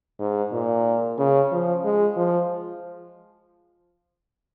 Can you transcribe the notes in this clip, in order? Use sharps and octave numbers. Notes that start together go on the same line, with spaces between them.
G#2
A#2
C#3
F3
G#3
F3